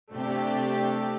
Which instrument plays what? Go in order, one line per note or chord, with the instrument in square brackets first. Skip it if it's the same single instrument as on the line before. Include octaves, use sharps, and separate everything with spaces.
[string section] C3 A3 D4 G4